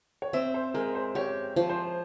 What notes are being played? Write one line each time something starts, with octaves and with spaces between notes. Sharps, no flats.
C#5
C4 E5
C5
G#3 A#4
C5
G4 C#5
F3
C5